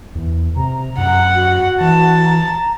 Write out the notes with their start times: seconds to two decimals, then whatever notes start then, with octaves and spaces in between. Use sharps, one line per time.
0.15 E2
0.57 C3 A#5
0.98 F#2 F#5
1.35 F#4
1.81 E3 A5
2.24 A#5